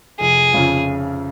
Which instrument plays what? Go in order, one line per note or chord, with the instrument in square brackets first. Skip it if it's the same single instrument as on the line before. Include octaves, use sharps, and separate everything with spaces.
[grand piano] F1 [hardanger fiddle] G#4
[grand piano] F2 C#3 F3